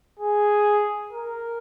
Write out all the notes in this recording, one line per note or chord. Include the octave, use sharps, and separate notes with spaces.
G#4
A#4